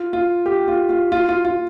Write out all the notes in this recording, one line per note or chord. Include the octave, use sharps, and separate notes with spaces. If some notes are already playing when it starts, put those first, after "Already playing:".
Already playing: F4
F4
G4
F4
F4
F4
F4
F4